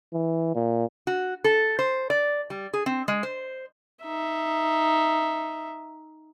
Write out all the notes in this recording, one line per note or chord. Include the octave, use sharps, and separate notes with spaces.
E3
A#2
F#4
A4
C5
D5
G3
G#4
C4
G#3
C5
D#4 E5